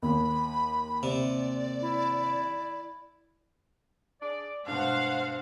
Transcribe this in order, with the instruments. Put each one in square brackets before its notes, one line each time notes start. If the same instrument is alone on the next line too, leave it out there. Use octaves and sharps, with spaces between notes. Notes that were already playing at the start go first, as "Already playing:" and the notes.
[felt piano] D#2 [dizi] B5
[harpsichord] C3 [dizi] D5
[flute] E4
[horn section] G#4 D5
[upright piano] G2 B2 [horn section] G#3 [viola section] C5 F#5 [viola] F5